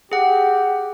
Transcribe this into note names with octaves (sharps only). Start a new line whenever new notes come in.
G4 G#4 F#5